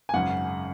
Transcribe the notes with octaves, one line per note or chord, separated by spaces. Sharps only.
G#5
G#1 F#2 C#3 F#5